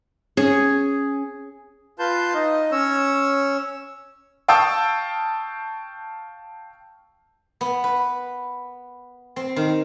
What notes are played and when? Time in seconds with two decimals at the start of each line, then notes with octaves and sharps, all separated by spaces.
0.37 C#4 G#4
1.99 F4 B4 A5 C6 G6
2.34 D#4 D#5
2.72 C#4 C#5 E6
4.48 F5 G5 A5 C#6 D#6 E6
7.61 B3
7.84 B4
9.36 C4
9.56 D#3